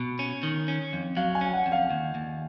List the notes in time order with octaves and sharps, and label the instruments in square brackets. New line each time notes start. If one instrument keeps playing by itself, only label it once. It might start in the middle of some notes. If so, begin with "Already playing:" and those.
Already playing: [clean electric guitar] B2
C#4
D#3
C#4
F2
[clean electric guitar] F#3 [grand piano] F5
[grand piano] G#5
[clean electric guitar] C#4
[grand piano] F#5
[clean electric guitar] F2
[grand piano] F5
[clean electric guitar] D#2
D#2